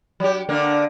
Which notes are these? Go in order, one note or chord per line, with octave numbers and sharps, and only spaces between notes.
F#3 G4
D3 A#3 D4